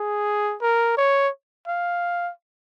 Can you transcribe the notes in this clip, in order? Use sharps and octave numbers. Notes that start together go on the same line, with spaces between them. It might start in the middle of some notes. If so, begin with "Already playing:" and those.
Already playing: G#4
A#4
C#5
F5